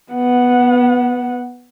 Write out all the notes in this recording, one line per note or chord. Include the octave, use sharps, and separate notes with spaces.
B3 F#5